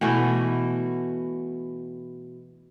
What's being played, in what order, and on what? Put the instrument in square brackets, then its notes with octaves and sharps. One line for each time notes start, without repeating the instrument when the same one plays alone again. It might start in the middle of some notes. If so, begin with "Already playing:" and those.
[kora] B2 E3 A3 F#4